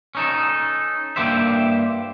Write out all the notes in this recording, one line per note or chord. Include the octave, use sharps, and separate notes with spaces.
C#4 D#4 A4
G2 A#3 E4 G4 C5 E5